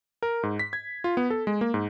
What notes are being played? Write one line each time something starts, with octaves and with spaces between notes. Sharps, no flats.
A#4
G#2
B6
G#6
F4
B3
A4
G#3
A#3
G#2